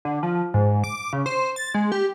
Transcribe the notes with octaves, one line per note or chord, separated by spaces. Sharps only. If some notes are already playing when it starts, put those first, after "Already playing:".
D3
F3
G#2
D6
C#3
C5
A6
G#3
G4